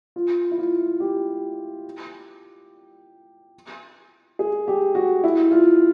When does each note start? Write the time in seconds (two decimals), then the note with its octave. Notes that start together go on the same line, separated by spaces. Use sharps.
0.16 F4
0.51 E4
0.58 F4
1.00 G4
4.39 G#4
4.68 G4
4.95 F#4
5.24 E4
5.52 F4